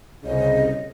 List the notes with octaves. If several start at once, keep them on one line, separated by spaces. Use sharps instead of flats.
C2 C#3 D#5